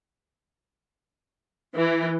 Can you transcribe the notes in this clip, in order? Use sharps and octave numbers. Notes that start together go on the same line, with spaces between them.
E3